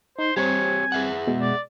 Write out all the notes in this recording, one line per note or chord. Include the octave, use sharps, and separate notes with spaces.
D#4 C5
G3 C4 G4 C5 C#5 G#5
G#4 E5 F#5
B2 G#3
D5